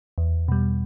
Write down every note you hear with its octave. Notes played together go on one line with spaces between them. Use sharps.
E2
B2 G3